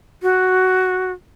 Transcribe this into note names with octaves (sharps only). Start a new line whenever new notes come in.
F#4